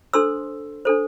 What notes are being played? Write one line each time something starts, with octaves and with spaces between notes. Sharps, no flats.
D4 A4 C5 C6 E6
D4 A4 C5